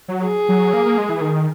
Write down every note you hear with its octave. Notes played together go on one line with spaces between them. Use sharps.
F#3
G#4
F#3
A#3
A#3
G#3
E3
D#3